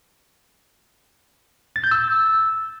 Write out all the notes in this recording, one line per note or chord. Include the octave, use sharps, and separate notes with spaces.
A6
G6
E6